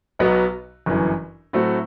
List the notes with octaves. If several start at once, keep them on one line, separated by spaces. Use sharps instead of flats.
B1 B2 F#3 B3
G1 F#2 E3
A2 F#3 A3 C4 F#4